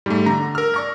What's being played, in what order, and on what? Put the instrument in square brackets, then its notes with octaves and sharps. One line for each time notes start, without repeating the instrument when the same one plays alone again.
[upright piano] G#2 [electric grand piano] G3 A3
[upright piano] D3 [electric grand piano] A#5
[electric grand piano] A#4 F6 [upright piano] E6
[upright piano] D5 C#6 A#6